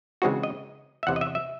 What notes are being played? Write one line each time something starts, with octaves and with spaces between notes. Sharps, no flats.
C#3 E3 G#3 C4 D#4 F#4
D#5
E5
E2 C3 E3 C4 F#5
D#5
E5
E5